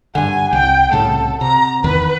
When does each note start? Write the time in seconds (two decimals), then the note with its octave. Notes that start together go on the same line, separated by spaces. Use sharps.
0.15 G2 D3 F#5 G#5
0.53 C2 G5
0.92 C2 A2 C#3 A4
1.41 C3 A#5
1.84 E2 D#3 E3 B4